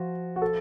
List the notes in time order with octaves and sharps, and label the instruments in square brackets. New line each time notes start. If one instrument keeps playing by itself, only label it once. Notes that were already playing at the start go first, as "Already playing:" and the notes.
Already playing: [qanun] F3 [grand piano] F#4
[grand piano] F#4
A4